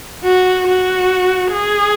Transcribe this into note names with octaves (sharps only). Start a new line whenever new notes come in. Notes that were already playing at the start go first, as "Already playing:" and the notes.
F#4
F#4
G#4